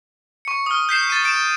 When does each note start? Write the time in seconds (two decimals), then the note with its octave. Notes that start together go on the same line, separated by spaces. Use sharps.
0.45 C#6 C#7
0.66 D#6 F6
0.89 G6 B6 C7 E7
1.10 A6 D#7
1.25 D7 E7